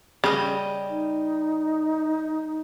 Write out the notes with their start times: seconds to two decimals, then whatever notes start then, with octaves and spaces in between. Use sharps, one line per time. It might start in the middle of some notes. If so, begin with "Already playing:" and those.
0.24 C#3 G3 D#5
0.90 D#4